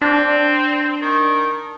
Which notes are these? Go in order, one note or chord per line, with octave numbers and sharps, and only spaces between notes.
C4 D4 A5
D#3